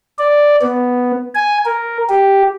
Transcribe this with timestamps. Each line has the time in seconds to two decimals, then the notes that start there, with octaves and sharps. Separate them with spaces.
0.18 D5
0.62 B3
1.35 G#5
1.65 A#4
2.09 G4